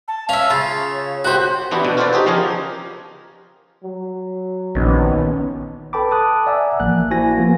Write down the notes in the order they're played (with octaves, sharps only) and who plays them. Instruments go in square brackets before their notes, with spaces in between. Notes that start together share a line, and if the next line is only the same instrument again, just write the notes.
[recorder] A5
[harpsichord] C#4 [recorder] C#5 [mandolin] E5 F5
[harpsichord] C#3 [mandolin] F4
[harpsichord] F#4 G4 [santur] C5 F#5
[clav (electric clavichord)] E3 B3 D4 E4 F#4 G4
B2 D4
F4 F#4 A4 B4 C5 D5
D#4 G4 G#4 C5
C#3 F3 C#4 G4 G#4 A#4
[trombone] F#3
[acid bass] A#1 [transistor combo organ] D#3 B3 C#4
[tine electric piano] A4 B4 G5 A5 B5 D6
A5 D6 D#6 F#6
D5 E5 F#5 G#5 A#5 E6
A1 F3 A#3 F#6
A#3 E4 F#4 C5 G#5 A#6
F3 A#3 B3 F4 F#4